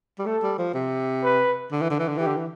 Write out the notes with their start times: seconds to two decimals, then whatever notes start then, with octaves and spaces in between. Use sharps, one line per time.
0.19 G3
0.26 A3 A4
0.42 G3
0.58 F3
0.74 C3
1.24 B4
1.72 D3
1.82 E3
1.90 D3
1.99 E3
2.08 D3
2.18 E3 G4
2.27 D3
2.37 E3